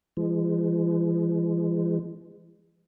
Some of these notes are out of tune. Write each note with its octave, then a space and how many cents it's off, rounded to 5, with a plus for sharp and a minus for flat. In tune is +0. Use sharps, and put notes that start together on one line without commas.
E3 +45 G#3 -25